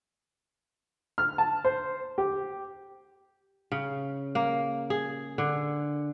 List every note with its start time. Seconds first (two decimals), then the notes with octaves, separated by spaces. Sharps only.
1.18 F6
1.38 A5
1.65 C5
2.18 G4
3.72 C#3
4.35 A#3
4.90 G#4
5.38 D3